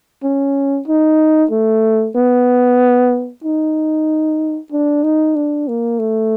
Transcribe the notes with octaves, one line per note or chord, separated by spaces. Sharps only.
C#4
D#4
A3
B3
D#4
D4
D#4
D4
A#3
A3